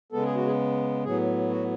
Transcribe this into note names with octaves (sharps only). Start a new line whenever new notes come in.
C#3 G#3 B3 A4
G#4
F#4
G#4
A2 F#3 B3 G#4
F#4